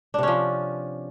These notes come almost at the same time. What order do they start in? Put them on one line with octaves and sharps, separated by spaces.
D4 C3 C#4 F3